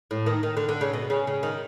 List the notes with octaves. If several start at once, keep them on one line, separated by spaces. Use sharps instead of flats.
A2
D#3
D#3
D3
D3
C#3
B2
C#3
C#3
D#3